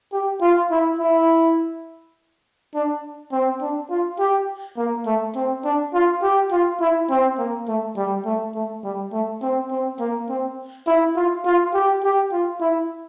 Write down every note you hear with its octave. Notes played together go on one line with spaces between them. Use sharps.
G4
F4
E4
E4
D4
C4
D4
F4
G4
A#3
A3
C4
D4
F4
G4
F4
E4
C4
A#3
A3
G3
A3
A3
G3
A3
C4
C4
A#3
C4
E4
F4
F4
G4
G4
F4
E4